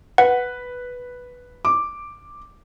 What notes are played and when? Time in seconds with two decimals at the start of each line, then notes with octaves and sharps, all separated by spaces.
0.18 B4 F#5
1.65 D6